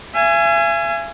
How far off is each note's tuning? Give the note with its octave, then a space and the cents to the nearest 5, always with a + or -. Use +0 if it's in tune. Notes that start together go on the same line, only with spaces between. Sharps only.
E5 +45 G#5 +0